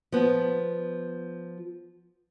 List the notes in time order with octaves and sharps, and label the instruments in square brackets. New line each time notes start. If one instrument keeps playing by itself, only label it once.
[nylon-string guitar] F3 B3